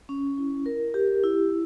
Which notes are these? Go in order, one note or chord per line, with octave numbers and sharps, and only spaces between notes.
C#4
E4
A#4
G4
E4